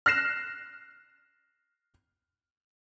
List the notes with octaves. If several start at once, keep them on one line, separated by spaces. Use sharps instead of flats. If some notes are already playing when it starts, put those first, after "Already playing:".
F6 F#6 A#6 C7 E7